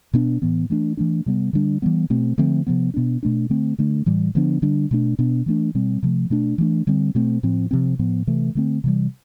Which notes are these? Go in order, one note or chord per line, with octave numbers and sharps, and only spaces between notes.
B2 B3 D4
A2 E3 B3
E3 A3 D4
E3 A3 D4
C3 G3 B3
D3 G3 D4
E3 G3 B3
B2 A3 C4
D3 F3 A3 C4
C3 F3 B3
B2 B3 D4
B2 A3 D4
D3 A3 C4
D3 A3 D4
A2 E3 G3
D3 F3 B3 D4
D3 G3 D4
B2 A3 D4
B2 B3 D4
E3 A3 D4
B2 G3 C4
C3 F3 A3
B2 A3 D4
E3 A3 D4
D3 G3 C4
B2 A3 C4
A2 F3 C4
C3 F3 C4
A2 F3 B3
C3 E3 A3
D3 A3 C4
C3 E3 G3